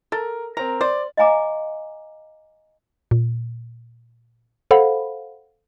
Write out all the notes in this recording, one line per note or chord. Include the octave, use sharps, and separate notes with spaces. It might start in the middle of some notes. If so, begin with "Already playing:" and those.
A4 A#4
C4 A#4 A#5
C5 D5
D#5 F5 G#5 A#5 D6
A#2
A4 C5 F5 F#5 B5